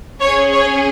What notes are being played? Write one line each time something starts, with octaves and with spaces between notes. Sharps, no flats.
C#4 G#4 C#5
C#5